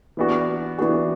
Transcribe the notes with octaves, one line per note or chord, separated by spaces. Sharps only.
E3 B3 D4 F#4
E3 B3 D4 F#4